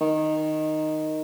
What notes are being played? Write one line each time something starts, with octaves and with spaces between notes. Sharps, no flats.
D#3